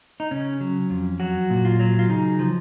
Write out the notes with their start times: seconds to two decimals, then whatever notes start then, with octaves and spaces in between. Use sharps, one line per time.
0.20 D#4
0.31 C#3 C#4
0.61 F#3
0.90 F2
1.20 F#3 F#4
1.50 A#2
1.65 F4
1.80 F#3
1.99 F4
2.09 C#3 D#4
2.39 F3